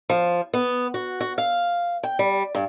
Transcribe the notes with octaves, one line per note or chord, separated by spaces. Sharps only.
F3
B3
F#4
F#4
F5
G5
G3
G2